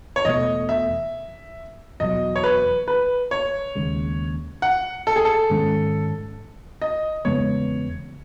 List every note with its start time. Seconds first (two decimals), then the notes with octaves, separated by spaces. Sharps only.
0.16 C#5
0.25 E2 B2 A3 D#5
0.69 E5
2.00 E2 B2 F#3 D#5
2.36 C#5
2.44 B4
2.88 B4
3.31 C#5
3.75 D#2 C#3 G#3
4.62 F#5
5.07 A4
5.16 G#4
5.25 A4
5.50 G#2 D#3 G#3 C#4
6.82 D#5
7.25 E2 C#3 G#3 B3 C#5